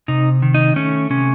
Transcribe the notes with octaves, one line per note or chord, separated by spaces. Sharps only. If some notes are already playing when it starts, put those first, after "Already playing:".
C3 D#4
D#3
D#4
A3 C#4
C3 C#4